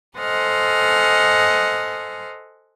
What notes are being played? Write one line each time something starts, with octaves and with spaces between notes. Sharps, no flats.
A4 C5 D#5 F#5 G#5 F6